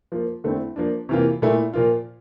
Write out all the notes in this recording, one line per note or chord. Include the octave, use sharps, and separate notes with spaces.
F3 A#3 F4
D3 A3 C4 E4
F3 A#3 D4
C3 E3 A#3 F4
A#2 A3 E4
A#2 F3 A#3 F4